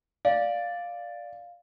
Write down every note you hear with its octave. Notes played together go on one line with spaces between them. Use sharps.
D5 F5